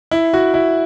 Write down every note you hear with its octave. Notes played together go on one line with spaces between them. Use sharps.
E4
F#4
E4